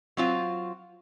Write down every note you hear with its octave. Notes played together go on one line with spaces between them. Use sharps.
F#3 C4 F4